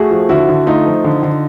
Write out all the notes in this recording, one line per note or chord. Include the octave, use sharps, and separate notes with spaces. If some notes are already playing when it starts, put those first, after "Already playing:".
Already playing: A3 F#4 G#4
F3
D3 E4 F#4
D3
A3 D#4 F4
F3
D3
D3